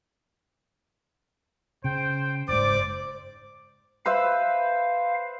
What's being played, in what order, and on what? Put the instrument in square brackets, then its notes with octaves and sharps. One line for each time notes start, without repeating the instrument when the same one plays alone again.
[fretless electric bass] C#3 [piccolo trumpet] C5 [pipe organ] G5
[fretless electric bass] F#1 G#2 [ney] C5 [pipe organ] D5 [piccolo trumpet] D6
[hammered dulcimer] B4 C5 E5 [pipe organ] F5